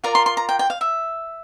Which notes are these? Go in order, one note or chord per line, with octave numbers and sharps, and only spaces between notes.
F4 A#4 D5 A#5
C6
C6
A#5
G5
G5
F5
E5